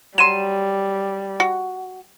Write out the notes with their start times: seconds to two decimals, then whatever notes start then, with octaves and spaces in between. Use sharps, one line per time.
0.18 F#3 G3 C6 D#7 E7
1.40 F#4